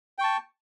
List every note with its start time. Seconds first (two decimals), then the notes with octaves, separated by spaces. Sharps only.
0.19 G5
0.21 C#6
0.24 A5